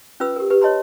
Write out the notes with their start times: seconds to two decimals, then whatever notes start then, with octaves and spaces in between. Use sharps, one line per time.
0.20 C#4 F4 B4 E6
0.36 G4 A#4
0.50 G4 B4
0.61 C#5 D#5 A5 B5 C6